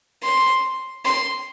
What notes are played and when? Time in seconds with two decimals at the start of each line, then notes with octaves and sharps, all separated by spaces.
0.24 C6
1.05 C6